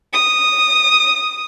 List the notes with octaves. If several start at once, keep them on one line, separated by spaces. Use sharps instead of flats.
D#6